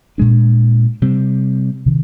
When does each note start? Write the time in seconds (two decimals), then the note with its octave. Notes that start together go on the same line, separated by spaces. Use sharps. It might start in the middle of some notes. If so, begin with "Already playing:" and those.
0.18 A#2 G#3 D4
1.02 C3 G3 C4
1.86 C3 D#3